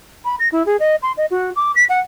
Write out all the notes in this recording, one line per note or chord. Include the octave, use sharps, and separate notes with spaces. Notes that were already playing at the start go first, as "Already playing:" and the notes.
B5
A#6
E4
G#4
D#5
C6
D#5
F#4
D6
B6
F#5